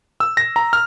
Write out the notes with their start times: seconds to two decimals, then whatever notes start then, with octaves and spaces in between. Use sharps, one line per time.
0.20 E6
0.37 A#6
0.56 A#5
0.73 F6